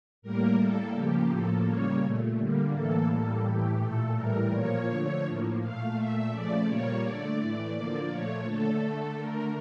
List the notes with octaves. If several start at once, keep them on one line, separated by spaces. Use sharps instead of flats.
A2 G3 A#3 A#4
A2 G3 A#3 A4
C#3 F3 A#3 G4
A2 F3 A#3 A4
C#3 G3 A#3 C#5
A#2 A3
D3 G3 A#3
A2 E3 A#3 A4
A2 G3 A#3 A4
A2 E3 A3 G4
A#2 A3 A4
A2 E3 G3 A#4
A#2 F3 A#3 C#5
D3 F3 A3 C#5
A2 F3 A#3
A#2 A3 F5
A#2 A3 E5
C#3 F3 A3 D5
A#2 G3 A#3 C#5
D3 A3 D5
A2 E3 A3 D5
D3 F3 A#3 D5
A#2 F3 A3 C#5
D3 A3 A4
D3 A3 A4
D3 A3 A#4